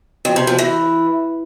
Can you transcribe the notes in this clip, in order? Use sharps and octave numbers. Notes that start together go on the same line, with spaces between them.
F2
C3
F3
E3